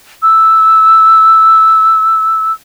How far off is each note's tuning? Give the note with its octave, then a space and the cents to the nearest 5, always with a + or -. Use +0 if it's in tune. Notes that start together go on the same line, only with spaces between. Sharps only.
E6 +0